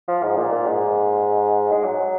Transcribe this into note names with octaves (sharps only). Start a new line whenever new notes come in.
F3
G#2
A#2
A#2
G#2
G#3
F#3